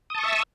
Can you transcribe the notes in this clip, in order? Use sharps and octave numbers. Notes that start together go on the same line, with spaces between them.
E5 A5 C#6 D#6 E6